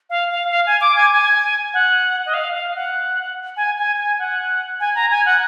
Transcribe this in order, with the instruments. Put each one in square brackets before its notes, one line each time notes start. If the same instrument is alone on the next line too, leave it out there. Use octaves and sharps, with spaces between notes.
[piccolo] F5
F5
F5
G#5
D6
G#5
G#5
F#5
D#5
F5
F5
F#5
G#5
G#5
G#5
F#5
G#5
A#5
G#5
F#5